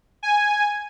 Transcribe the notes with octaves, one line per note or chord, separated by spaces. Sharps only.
G#5